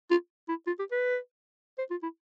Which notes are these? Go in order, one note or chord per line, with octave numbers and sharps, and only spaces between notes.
F4
E4
F4
G4
B4
C5
F4
E4